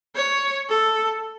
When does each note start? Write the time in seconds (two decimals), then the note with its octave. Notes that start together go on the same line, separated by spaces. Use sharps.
0.15 C#5
0.69 A4